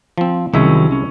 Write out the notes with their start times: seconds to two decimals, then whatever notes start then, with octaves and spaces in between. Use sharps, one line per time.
0.18 F3 C4
0.54 C2 D#3 F#3 G#3 C#4 E5
0.92 C#4